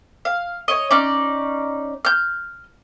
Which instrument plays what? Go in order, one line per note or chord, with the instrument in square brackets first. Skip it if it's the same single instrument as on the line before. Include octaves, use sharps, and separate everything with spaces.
[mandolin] F5
C#5 D#5
C#4 D#4 D5
F6 G6